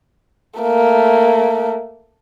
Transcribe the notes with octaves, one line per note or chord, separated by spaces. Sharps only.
A3 A#3